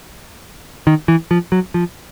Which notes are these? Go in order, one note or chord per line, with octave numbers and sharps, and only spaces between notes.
D#3
E3
F3
F#3
F3